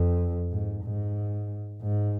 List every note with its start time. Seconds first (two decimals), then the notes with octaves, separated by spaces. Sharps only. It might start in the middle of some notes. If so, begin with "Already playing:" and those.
Already playing: F2
0.52 G#2
0.84 G#2
1.82 G#2